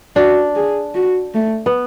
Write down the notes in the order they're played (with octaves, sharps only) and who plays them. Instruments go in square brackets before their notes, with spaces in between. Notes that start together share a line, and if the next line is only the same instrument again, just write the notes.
[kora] D4 [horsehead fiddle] F#4
[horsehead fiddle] G#4
F#4
A3
[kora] B3